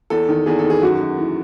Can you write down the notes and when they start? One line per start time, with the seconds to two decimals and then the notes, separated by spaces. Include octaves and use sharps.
0.10 E2 A4
0.29 D#3
0.46 E2 G#4
0.59 A4
0.64 D#3
0.70 G#4
0.82 F#2 F#4
1.01 F#2
1.18 E3